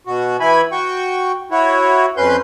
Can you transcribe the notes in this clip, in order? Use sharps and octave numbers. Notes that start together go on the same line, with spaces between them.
B2 F#4
E3 E4 G#5 B5
F#4 G5 C#6
E4 F#4 C#5
F2 C#4 B4 C6 G6